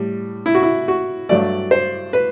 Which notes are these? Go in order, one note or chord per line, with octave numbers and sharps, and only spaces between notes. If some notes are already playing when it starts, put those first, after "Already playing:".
Already playing: A2 G3
E4
F#4
E4
F#4
G2 F#3 A3 D5
C5
B4